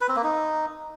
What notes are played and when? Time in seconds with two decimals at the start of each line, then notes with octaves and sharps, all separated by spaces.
0.01 B4
0.09 C4
0.16 A#3
0.24 D#4